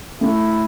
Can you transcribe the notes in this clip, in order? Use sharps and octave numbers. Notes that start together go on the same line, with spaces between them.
A3 E4